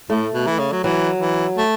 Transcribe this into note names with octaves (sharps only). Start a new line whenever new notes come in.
A2 A3
B2
E3
C#3
F#3
E3 F#3
E3
A3